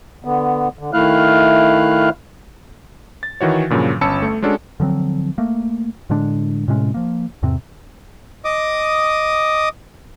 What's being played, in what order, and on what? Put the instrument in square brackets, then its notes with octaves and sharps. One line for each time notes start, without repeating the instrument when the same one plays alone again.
[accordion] D3 B3
D3
D#3 A3 E4 F5 F6 F#6
[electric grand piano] A6
D#3 E3 F#4 C#5
G2 A#2 C#3 F3 F#3
G1 C#4 A5 B5 E6 C#7
A3
G#3 C#4 D4 F#4 A4
[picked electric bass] D3 F3 F#3 C4
A3 A#3
A2 D3 G#3 D4
A2 C3 G#3 C#4
F3 A#3
E2 G#2 C3 C4
[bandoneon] D#5 D6 D#6